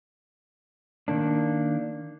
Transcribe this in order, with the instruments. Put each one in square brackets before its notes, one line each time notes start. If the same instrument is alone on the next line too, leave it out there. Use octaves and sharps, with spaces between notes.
[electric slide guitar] D#3 A#3 D4